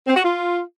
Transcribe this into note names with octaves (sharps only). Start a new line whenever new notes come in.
C4
F#4
F4